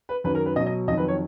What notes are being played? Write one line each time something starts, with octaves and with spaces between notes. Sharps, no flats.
B4
F#2 D#3 F#3 B4
A#4
B4
B2 F#3 D#5
D#5
F2 D#3 F#3 D#5
B4
C#5